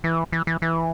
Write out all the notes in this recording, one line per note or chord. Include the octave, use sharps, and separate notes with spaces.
E3
E3
E3
E3